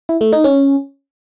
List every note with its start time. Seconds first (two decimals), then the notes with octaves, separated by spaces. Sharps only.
0.09 E4
0.21 A3
0.33 D#4
0.44 C#4